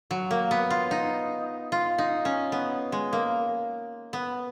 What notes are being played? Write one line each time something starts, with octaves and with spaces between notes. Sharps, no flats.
F#3
A#3
B3
F4
D#4
F4
D#4
C#4
B3
G#3
A#3
B3